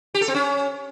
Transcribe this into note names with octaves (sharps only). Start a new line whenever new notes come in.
G4
A4
C4
C#4